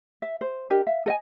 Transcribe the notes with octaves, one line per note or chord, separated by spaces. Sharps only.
E5
C5
D4 G4 A#4 D#5
E5 F5
A4 D#5 G#5